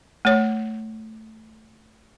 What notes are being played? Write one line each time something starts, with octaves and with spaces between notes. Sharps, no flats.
A3 C#5